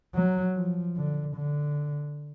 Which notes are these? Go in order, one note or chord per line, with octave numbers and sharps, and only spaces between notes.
F#3
F3
D3
D3